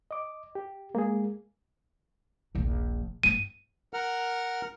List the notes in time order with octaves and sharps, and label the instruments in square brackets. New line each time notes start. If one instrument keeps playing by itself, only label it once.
[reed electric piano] D#5 D6
G4
[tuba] G#3 [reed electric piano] A#3 G#4
[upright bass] D#1 A#1
[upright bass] G2 B3 [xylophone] D#7
[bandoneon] A#4 F#5 F6